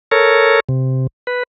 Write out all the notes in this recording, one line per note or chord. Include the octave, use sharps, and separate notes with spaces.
A4 A#4 C#5
C3
B4